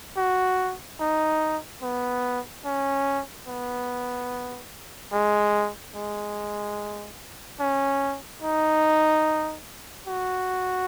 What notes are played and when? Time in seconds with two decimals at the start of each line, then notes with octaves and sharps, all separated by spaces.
0.17 F#4
1.00 D#4
1.82 B3
2.65 C#4
3.48 B3
5.12 G#3
5.96 G#3
7.60 C#4
8.42 D#4
10.08 F#4